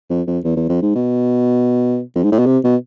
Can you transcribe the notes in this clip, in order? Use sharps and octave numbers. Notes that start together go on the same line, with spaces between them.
F2
F2
E2
E2
F2
G#2
B2
F2
G#2
A2
B2
C3
B2